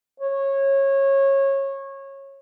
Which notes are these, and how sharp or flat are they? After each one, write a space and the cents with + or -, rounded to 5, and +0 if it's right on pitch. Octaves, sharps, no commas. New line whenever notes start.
C#5 -20